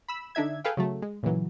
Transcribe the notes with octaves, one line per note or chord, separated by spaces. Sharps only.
B5 E6
D3 D4 D#4 E5 G#6
G#4 A4 B4 F5 G5
C#3 F#3 A3
G#3
A#2 C#3 E3 F#3